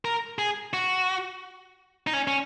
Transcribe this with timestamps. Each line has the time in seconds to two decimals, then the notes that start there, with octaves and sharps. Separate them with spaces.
0.05 A#4
0.39 G#4
0.73 F#4
2.07 D#4
2.13 C#4
2.28 C#4